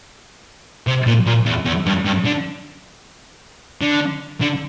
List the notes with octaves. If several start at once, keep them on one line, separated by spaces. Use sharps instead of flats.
C3
A#2
A#2
E2
E2
G2
G2
D3
D3
D3